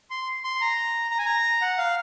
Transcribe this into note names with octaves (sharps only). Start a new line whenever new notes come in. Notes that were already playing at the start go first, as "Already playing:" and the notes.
C6
C6
A#5
A#5
G#5
A#5
F#5
F5